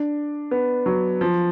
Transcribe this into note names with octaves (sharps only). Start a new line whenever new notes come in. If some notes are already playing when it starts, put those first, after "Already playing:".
Already playing: D4
B3
F#3
F3